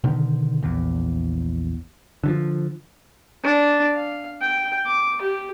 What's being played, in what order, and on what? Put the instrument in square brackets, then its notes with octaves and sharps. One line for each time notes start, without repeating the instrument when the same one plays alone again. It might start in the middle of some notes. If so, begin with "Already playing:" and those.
[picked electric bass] B2 D3 D#3
A#1 E2
D3 E3 F3
[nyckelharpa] D4
F5
G5
D6
G4